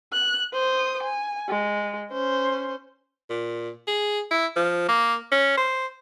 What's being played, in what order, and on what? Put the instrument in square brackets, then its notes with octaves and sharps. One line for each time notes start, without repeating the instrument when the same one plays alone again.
[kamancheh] F#6
C5 D#6
G#5
G#3
C#4 C5
[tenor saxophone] A#2
G#4
E4
F3
A#3
C#4
C5